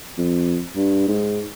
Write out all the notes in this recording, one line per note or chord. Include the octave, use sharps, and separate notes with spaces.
F2
G2
G#2